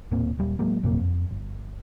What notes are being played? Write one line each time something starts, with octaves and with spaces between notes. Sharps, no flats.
D#1 A2 A#3 C4
D#1 G3
A2 F#3 G#3 A#3
A#1 F#2 C3 A#3
F2
G1